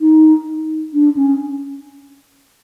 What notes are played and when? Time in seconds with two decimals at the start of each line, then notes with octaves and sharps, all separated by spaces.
0.01 D#4
0.93 D4
1.16 C#4